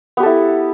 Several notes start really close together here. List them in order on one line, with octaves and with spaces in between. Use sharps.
B3 G4 A4 E4